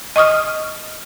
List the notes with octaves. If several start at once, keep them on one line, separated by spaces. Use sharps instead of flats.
D#5 C#6 D#6 F6